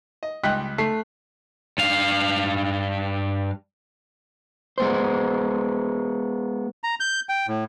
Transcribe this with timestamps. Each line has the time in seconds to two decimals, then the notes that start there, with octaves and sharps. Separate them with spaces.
0.23 D#5
0.43 C#2 G3 D#5 G5 F#6 B6
0.78 A3 C7
1.78 G2 F5
4.78 G#3 B3 C5
6.84 A#5
7.00 G6
7.29 G5
7.48 A2